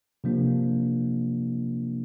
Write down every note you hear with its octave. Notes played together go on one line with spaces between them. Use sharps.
C3 F3 A#3 D4